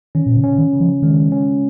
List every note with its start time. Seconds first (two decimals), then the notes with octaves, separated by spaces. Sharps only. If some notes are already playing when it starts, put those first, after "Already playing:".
0.15 D#3 C#4
0.26 A#2
0.37 C#3
0.44 C#4
0.58 D#3
0.73 C#3
0.80 F3
1.03 D#3 G#3
1.32 C#4